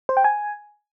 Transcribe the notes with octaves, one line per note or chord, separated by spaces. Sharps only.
C5
G5
G#5